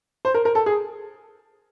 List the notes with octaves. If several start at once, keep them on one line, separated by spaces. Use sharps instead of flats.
C5
A#4
A#4
A4
G#4